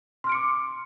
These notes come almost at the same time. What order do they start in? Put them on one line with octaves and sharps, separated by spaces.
C6 F6 D7 C#7 D6